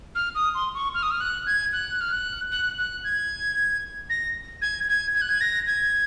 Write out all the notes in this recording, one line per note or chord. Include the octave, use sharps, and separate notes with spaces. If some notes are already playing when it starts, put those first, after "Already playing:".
F6
D#6
C6
C#6
F6
D#6
F6
F#6
G#6
F#6
F6
F#6
F#6
F#6
G#6
A#6
G#6
G#6
G#6
F#6
G#6
A#6
G#6